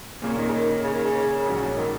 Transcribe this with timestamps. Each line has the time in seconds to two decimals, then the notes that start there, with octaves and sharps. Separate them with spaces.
0.22 A#2 C#3 A#3 C#4
0.38 D#3
0.48 C#3
0.53 D#3
0.83 C#3
0.94 D#3
1.05 C#3
1.45 A#1 G#2 F#3 C#4
1.76 D#3